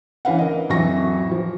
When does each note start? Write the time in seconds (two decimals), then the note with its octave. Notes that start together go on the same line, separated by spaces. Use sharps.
0.25 D2 E3 C#4 B4 F5 F#5
0.39 A#4 D#5
0.69 A1 F2 E3 F#3 C#6 A#6
1.31 F3